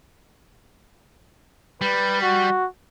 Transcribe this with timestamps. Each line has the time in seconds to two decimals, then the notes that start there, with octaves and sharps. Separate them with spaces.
1.81 G3 B4
2.21 F#4